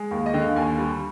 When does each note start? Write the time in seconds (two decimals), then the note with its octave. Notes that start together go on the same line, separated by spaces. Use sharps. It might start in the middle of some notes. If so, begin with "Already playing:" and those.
Already playing: G#3
0.11 D#2 F5
0.26 D#5
0.33 D3 G5
0.41 F5
0.56 D#2 G#5
0.78 G3